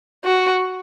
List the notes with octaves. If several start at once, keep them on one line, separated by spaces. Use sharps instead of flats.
F#4